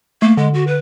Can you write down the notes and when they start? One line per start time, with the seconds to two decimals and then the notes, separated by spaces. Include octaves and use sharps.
0.22 A3 A#3
0.37 D3 G#3
0.54 F#4
0.67 B4